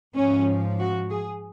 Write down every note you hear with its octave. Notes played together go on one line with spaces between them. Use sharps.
G#2 F3 C#4
F#4
G#4